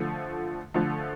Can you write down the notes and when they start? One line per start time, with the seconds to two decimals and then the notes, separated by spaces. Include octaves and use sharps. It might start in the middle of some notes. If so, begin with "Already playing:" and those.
Already playing: D3 F3 A3
0.74 D3 F3 A3